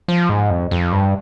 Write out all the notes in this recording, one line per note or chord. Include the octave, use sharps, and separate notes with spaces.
F3
G#2
F2
F2
G2